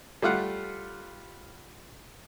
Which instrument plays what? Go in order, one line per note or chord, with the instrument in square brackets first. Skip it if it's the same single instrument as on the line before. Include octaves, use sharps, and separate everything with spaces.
[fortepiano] G3 A3 F4 F5 F#5